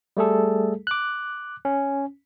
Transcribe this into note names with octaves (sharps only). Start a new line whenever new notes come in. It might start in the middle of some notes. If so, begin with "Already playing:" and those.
G3 A3 G#4 A4
D6 F#6
C#4